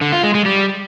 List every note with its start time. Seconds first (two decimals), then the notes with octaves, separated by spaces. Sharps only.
0.01 D3
0.12 F4
0.23 G#3
0.35 G#3
0.46 G3